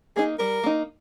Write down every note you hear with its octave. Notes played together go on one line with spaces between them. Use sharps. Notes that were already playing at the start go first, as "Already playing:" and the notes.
A#3 D#4 G#4
G3 A#4
A#3 D#4